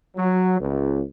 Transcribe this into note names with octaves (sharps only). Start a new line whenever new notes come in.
F#3
C#2